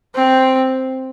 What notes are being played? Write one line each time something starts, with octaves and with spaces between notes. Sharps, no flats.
C4